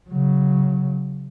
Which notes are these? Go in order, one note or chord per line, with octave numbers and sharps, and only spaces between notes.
C#3 F#3